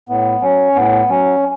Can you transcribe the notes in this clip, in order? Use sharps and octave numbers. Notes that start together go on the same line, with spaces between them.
A2 B3
F#3 C#4
A2 B3
F#3 C#4